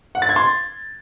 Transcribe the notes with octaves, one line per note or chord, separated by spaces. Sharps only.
F#5
A6
G#6
C6